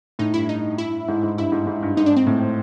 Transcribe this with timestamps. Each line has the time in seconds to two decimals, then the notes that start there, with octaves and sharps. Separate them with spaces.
0.19 A2 D#4
0.34 G2 E4
0.49 D#4
0.78 E4
1.08 G#2
1.23 G#2
1.38 G2 E4
1.52 G#2
1.67 G#2
1.83 G2
1.97 G#2 D#4
2.06 D4
2.17 C4
2.27 A2